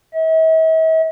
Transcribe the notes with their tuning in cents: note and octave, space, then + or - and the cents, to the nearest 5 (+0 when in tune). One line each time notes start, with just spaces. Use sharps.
E5 -45